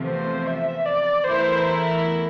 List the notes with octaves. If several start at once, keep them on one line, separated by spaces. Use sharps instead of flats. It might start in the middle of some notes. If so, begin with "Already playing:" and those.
Already playing: E2 C3 F3 A3
C5
E5
D5
E2 E3 A3 E4 A#4 C5